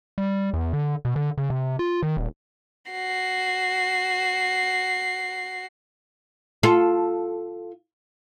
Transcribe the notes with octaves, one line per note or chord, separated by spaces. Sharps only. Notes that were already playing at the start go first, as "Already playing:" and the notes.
G3
E2
D3
B2
D3
C#3
C3
F4
D#3
D#1
F#4 C7
F4 A4